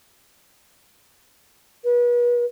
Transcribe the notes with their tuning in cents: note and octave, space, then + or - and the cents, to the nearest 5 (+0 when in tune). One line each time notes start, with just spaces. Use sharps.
B4 -35